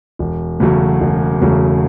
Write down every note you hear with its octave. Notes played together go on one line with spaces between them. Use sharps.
E1
E2 C#3 F#3 A3
E1
E2 C#3 F#3 A3